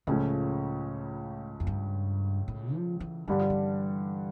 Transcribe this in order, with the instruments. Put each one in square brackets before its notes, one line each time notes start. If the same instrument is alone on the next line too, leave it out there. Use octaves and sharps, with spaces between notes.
[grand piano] C#2 C#3 F3 A3 C#4 [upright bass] A2
[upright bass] F2
G2
A2
F3
E3
[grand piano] G2 D3 G3 D4 [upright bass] E3
[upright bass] F3
E3